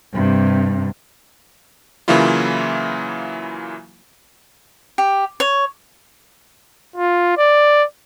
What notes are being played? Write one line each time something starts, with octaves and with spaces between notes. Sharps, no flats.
G2 C3
C#3 E3 F#3 A#3 E4 F4
G4
C#5
F4
D5